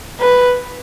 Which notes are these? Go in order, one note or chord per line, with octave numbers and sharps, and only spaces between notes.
B4